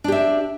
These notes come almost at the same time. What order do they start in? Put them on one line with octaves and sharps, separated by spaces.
D4 G4 E5